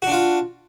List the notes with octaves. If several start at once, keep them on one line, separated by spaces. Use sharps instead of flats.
D4 F4 F#4